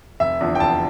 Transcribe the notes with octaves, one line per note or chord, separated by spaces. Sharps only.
F1 E5
E2 D3 F3
G5
F1 A5